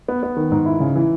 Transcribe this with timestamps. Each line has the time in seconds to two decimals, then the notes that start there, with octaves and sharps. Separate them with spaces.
0.08 B3
0.23 B3
0.36 D#3
0.52 G#2
0.65 E4
0.80 C#3
0.95 E3